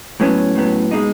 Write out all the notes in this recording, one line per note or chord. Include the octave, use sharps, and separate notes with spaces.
A2 F#3 B3 C#4
A2 F#3 B3
B2 G#3 D#4